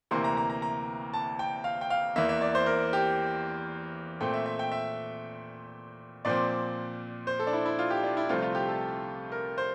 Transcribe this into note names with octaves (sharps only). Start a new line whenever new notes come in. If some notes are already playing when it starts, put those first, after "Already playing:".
D2 C3 E3 A#3 C6
A#5
A#5
A#5
A#5
A5
G5
F5
G5
F5
E2 E3 A#3 E5
E5
D5
C5
A#4
G4
A#2 A3 C4 G5
E5
E5
G5
E5
A#2 F3 C4 D5
C5
A4
D4
E4
E4
F4
G4
D4
E4
C2 C3 F3 A3 C4 F4
F4
G4
A4
A#4
C5